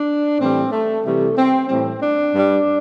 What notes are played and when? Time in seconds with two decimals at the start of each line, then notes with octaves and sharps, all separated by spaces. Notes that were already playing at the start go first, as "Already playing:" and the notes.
Already playing: D4
0.39 A2 E3 G3 C4
0.72 A3
1.05 C3 E3 G3 A3
1.37 C4
1.68 A2 E3 G3 C4
2.02 D4
2.33 G2 G3